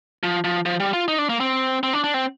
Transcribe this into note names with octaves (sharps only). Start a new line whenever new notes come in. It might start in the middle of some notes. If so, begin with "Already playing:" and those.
F3
F3
F3
G3
F4
D#4
D4
A#3
C4
C4
D4
D4
C4